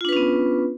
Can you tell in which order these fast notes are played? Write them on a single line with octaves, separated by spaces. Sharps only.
F4 D4 B4 C#4 B3